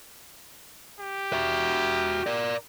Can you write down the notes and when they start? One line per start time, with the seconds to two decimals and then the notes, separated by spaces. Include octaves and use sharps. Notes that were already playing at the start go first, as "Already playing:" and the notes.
1.00 G4
1.33 F#4 E5
2.26 A#4 D5